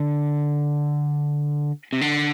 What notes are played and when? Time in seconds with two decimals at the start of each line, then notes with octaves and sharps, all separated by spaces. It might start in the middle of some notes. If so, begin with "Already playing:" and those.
Already playing: D3
1.93 C3
2.01 D3